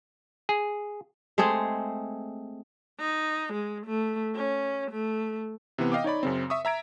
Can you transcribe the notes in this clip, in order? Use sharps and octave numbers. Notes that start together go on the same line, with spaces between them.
G#4
G#3 A3 C4 G#4
D#4
G#3
A3
C#4
A3
C3 E3 B3
D#5 F5 G5 D6
D#4 C#5 D5 B5
F#2 C#3 C4
E5 C#6 D#6
E5 A#5 G#6 D7